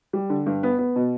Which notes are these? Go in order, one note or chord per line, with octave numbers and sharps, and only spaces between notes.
G3
D3
G2
B3
B3
B2